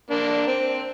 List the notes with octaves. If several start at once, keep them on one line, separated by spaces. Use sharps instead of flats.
A#3 D4
C4